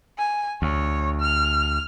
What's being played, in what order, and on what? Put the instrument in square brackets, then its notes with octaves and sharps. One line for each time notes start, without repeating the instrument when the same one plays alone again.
[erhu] G#5
[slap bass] D2 [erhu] C#5
[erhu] F6